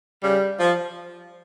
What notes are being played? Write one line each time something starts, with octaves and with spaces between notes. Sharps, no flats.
C#3 G3
F3